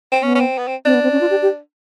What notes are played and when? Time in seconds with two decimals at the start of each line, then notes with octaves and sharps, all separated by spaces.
0.12 C4
0.22 B3 C#4
0.35 C#4
0.40 C4
0.58 B3
0.67 C4
0.85 C4 D4
0.94 B3
1.03 C4
1.12 C#4
1.21 F4
1.30 G4
1.42 G4